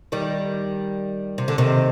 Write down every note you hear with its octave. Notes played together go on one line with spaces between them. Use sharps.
D#3 G3
C3
D3
C3 D#3